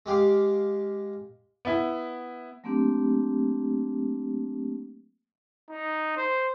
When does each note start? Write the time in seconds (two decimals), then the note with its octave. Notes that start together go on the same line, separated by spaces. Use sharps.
0.06 G#3 G4 F5 D6
1.65 B3 E4
2.64 F#3 A3 A#3 C4 D4 G4
5.70 D#4
6.17 C5